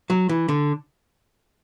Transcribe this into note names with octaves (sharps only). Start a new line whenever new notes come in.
F#3
E3
D3